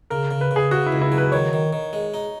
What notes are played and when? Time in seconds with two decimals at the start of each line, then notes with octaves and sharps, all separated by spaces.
0.10 C#3 A#4
0.31 C#3
0.41 B4
0.51 C#3 G#4
0.71 C#3 F#4
0.86 E4
0.92 C#2
1.02 E4
1.12 F#3
1.18 B4
1.32 D#3 C#5
1.53 D#3
1.73 D#3
1.93 G#3
2.14 D#4